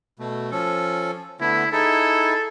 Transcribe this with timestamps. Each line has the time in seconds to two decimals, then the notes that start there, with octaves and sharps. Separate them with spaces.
0.19 B2 A3
0.52 F3 C#4 A4
1.41 D3 A3 B3 E4
1.72 D#4 E4 G#4 A4